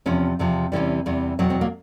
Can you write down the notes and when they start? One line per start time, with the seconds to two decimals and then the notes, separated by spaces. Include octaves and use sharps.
0.06 E2 C3 F3 C#4
0.39 E2 C3 F3
0.72 E2 C3 E3 G3 C#4
1.06 E2 C3 E3 G3
1.39 E2 B2 F#3 C4
1.50 C4
1.61 A#3